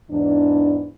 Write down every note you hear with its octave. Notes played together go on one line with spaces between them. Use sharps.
E2 G#2 E3 D4